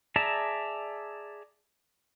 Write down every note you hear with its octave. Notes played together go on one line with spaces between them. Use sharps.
G#4 D5 E5 A5 A#5